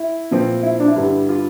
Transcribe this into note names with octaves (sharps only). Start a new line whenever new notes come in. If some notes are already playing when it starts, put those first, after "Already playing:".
Already playing: E4
A#2 F3 C4
E4
D4
E4
G2 D3 G3
F4